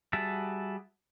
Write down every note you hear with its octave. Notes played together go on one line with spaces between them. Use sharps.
G3 F#4 G#4 E5 A5